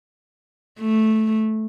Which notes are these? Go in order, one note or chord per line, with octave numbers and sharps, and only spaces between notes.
A3